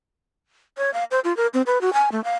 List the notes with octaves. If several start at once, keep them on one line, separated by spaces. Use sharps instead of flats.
C#5
F5
C5
F4
A#4
C4
B4
F#4
G#5
A3
F5